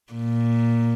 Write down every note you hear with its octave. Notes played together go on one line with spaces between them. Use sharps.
A#2